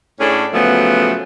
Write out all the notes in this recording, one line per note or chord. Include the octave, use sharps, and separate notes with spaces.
A2 C#4 D4 G#4 A4
C#3 F3 F#3 A3 B3